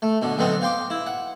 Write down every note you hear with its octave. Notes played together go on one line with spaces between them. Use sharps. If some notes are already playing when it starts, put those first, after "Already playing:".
A3
B2 D3
B1 D3 B3 C4 D#5
F5 G5 C6 D6
E4
F#5